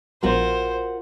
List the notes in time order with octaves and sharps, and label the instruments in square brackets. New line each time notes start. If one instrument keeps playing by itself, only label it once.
[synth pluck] A#1 B2 [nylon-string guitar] F4 F#4 A#4 [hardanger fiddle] C5